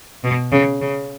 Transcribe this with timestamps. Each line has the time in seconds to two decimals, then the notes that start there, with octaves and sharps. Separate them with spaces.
0.24 B2
0.52 C#3
0.81 C#3